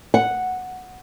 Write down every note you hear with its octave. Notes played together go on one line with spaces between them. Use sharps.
F#5